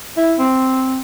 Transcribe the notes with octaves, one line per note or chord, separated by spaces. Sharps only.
E4
C4